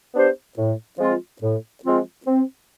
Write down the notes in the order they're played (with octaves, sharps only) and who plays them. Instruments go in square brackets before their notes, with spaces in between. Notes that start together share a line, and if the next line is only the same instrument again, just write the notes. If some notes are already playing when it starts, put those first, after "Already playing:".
[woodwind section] B3 D4 G4 C5
A2
F3 G#3 C4 F4
A2
F3 G#3 C4 F4
C4